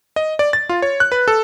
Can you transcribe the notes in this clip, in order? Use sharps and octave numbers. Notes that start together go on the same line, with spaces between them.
D#5
D5
A6
F4
C#5
F#6
B4
A4